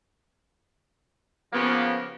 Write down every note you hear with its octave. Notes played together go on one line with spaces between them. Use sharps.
C#3 F3 A#3 B3 G4